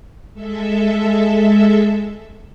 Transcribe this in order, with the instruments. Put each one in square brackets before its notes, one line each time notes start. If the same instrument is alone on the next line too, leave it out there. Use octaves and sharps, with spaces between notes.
[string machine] G#3 A4 E5